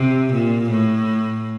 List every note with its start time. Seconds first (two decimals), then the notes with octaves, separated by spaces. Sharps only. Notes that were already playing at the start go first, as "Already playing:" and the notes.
Already playing: C3
0.33 A#2
0.70 A2